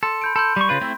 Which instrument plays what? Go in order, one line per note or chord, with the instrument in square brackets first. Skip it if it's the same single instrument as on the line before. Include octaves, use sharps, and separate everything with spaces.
[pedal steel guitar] A4 [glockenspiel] C6
[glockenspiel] B5 G6 D7
[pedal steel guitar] A4 [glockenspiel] B5 C6 G6
[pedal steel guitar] G3 C#6
C#3 F4 B4
A3 C4 E4